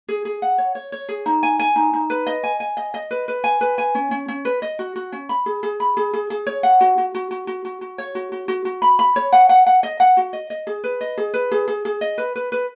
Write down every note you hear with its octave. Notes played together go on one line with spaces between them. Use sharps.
G#4
G#4
F#5
C#5
C#5
C#5
G#4
D#4
G#5
G#5
D#4
D#4
B4
D#5
G#5
G#5
D#5
D#5
B4
B4
G#5
B4
G#5
C#4
C#4
C#4
B4
D#5
F#4
F#4
C#4
B5
G#4
G#4
B5
G#4
G#4
G#4
C#5
F#5
F#4
F#4
F#4
F#4
F#4
F#4
F#4
C#5
F#4
F#4
F#4
F#4
B5
B5
C#5
F#5
F#5
F#5
D#5
F#5
F#4
D#5
D#5
G#4
B4
D#5
G#4
B4
G#4
G#4
G#4
D#5
B4
B4
B4